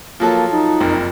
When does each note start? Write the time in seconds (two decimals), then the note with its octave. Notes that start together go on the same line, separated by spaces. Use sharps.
0.20 F3 F#3 A#3 F4 A4
0.51 D#4
0.81 F#1 F2 A#4